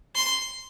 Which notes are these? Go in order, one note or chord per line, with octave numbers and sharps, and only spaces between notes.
C6